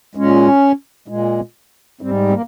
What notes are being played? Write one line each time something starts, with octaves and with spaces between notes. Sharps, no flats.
A#2 G#3 C#4
A#2 G#3
G#2 G3 C4
C4
A#3